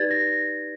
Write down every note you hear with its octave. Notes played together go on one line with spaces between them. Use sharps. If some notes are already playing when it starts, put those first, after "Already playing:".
Already playing: D#4 G4 B4 D5 G#6 A6
A#6